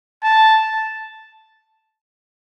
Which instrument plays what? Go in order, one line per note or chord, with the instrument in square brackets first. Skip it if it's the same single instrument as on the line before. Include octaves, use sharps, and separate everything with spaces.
[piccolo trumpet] A5